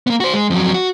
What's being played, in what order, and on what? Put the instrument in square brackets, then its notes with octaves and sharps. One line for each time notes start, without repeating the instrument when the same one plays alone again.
[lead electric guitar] A#3 B3
F#4 C5
G#3
F2 F#3
F#4